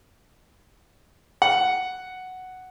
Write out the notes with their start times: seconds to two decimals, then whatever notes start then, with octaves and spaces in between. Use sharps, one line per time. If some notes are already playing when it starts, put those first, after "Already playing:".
1.42 F#5